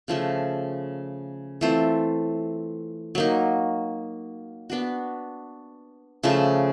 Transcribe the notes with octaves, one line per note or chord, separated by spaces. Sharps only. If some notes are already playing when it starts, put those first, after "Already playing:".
C#3 F3 A3
E3 A3 C4 F4
F#3 A#3 D#4
B3 D4 F#4
C#3 F3 A3